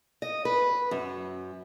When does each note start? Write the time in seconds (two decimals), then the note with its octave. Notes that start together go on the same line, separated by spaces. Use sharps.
0.22 D#5
0.45 B4
0.91 F#2